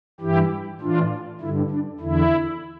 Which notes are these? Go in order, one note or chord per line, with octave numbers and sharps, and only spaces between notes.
G2 E3 E4 G4
A2 E3 D4 F4
G2 D3 E4
D4
E2 D3 E4